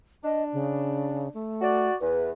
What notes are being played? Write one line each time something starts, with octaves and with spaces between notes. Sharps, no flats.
D4 D#5
C#3
A3
F#4 D5
E2 B4